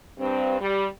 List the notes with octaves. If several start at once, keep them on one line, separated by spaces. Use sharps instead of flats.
G2 C4
G3